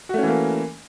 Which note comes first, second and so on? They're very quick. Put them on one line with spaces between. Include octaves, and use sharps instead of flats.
F#4 A3 C#4 E3 A#3